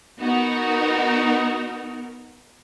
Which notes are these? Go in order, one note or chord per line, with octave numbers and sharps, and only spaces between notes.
B3 D#4 F#4 A#4